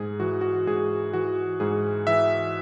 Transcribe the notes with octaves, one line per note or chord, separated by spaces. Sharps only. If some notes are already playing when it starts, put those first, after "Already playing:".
Already playing: G#2 G#4
E3 F#4
F#4
G#2 G#4
E3 F#4
G#2 G#4
E3 E5